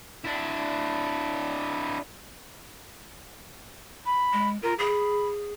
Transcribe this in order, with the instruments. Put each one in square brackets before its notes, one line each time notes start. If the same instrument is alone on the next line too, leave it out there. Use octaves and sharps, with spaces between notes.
[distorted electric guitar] D4 E4
[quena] B5
[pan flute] G#3
[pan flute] F4 [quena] A#4
[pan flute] G#4 [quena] B5